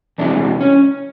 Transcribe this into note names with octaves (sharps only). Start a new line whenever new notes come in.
E2 C3 E3 G#3 D4
C#4